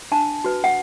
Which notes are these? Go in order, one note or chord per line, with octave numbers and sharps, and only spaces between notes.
D4 A5
F#4 B4
F#5